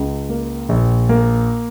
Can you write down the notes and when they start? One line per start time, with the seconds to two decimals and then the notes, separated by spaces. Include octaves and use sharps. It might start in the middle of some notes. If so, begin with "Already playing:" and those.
Already playing: C#2
0.29 A#3
0.69 A#1
1.09 A#3